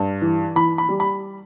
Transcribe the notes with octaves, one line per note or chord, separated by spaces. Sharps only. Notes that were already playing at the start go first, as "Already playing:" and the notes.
Already playing: G2
E3
E3 B5
B5
G3
B5